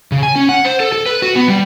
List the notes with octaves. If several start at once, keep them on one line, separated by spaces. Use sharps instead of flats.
C#3
G#5
C#4
F#5
C5
A4
A4
B4
F#4
B3
G3